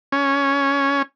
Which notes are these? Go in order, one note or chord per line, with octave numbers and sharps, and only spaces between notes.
C#4